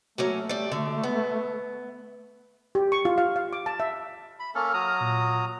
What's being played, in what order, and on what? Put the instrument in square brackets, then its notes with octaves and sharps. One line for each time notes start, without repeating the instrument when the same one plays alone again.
[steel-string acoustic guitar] F#3 A#3 C#4 [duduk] A3
[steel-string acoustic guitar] G3 D5
D3
B3
[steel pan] G4
C#6
F4
F5
F5
D6
A5
E5
[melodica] B5
[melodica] A#3 C#4 A4 [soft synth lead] F6
[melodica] F#3 A#5 D#6
[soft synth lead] A#2